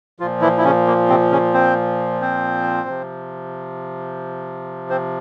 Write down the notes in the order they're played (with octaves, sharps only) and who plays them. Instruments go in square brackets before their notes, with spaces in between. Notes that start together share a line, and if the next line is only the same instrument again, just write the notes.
[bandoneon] F3 F4
A#2
E3 E4
E4
C#3 C#4
A#3
C3 C4
C#3 C#4
C4 C5
C4 C5
C3 F3
C4 C5